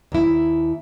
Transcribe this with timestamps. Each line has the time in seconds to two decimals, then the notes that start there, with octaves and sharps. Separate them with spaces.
0.12 D#2 E4